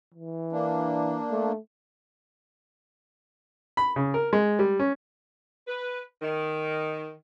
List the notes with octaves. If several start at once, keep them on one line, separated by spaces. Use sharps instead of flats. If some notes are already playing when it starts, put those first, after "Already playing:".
E3
A#3 D4
A3
B5
C#3
A#4
G#3
G3
C#4
B4
D#3